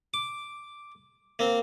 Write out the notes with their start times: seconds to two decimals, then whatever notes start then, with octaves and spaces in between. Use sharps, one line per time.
0.14 D6
1.39 A#3 C4